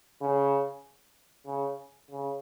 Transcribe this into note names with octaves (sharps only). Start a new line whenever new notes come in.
C#3
C#3
C#3